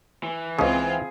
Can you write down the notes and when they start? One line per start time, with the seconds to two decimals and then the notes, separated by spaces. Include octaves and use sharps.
0.23 E3
0.59 C#2 C#3 C4 F4 G#4